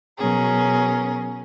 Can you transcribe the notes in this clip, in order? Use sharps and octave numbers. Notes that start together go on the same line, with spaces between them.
B2 F#3 C#4 G#4 A#4